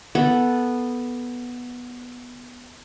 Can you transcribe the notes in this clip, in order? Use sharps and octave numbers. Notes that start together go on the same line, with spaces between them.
B3 A4